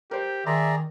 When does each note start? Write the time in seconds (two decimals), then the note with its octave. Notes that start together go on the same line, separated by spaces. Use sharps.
0.11 G4 A#4 C5
0.46 D#3 G#4 D5 E5 A#5 C6